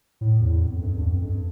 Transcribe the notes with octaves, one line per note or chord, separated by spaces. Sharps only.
A2
E2
F2
G2
E2
F2
G2